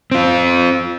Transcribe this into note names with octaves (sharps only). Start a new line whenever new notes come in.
C4 F4